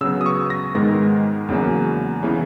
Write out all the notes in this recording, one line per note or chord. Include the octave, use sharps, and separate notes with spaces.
C#3 F#3 B3 E6
D#6
C#6
A#6
G#2 D#3 G#3 B3 A#6
E2 C#3 F#3 A#3
C#3 E3 B3